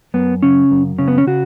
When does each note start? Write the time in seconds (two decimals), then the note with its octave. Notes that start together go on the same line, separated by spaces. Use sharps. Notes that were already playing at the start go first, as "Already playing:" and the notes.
0.14 F#2 B3
0.43 C#3 C#4
0.71 F#2
0.98 C#3 C#4
1.08 B3
1.18 C#4
1.27 C#3 F#4